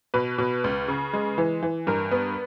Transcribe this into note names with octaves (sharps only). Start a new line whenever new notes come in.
B2 B4
B2
C#2
C#3
G#3
E3
E3
G2 A#4
B3